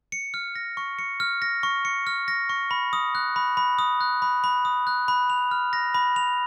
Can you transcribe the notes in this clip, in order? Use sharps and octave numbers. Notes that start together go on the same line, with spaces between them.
C#7
F6
A#6
C#6
C#7
F6
A#6
C#6
C#7
F6
A#6
C#6
B5
D#6
F#6
B5
B5
D#6
F#6
B5
B5
D#6
F#6
B5
F7
F6
A#6
B5
F7